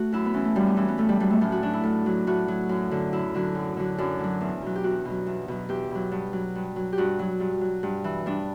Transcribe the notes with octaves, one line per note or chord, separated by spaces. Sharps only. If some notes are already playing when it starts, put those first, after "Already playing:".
Already playing: A3 F#4
F#2 E4
B3
E3 C#4
A3
F#2 G3
B3
E3 C#4
B3
A2 A3
G3
F#3 G3
A3
A2 C#4
F#4
F#3 D4
E4
A2
F#3
A2 F#4
F#3
F#2
D3 F#3
F#2 E4
D3 F#3
F#2
D3 F#3
F#2 D4
D3 F#3
E2
B2 F#3
G4
E2 F#4
B2 F#3
E2
B2 F#3
E2 G4
B2 F#3
G2
F#3
G2
F#3
G4
G2 F#4
F#3
G2
F#3
G2
E3
G2 D4